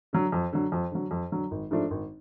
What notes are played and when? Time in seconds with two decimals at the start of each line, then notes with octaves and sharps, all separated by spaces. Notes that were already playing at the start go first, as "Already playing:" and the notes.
0.13 D3 F#3
0.32 F2
0.53 D3 F#3
0.72 F2
0.92 D3 F#3
1.11 F2
1.32 D3 F#3
1.51 G#1
1.71 G#2 F3 A3 D4
1.91 G#1